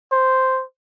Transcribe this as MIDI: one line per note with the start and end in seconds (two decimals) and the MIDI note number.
0.12 0.63 72